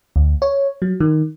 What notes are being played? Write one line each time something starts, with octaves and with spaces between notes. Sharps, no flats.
D2
C#5
F#3
D#3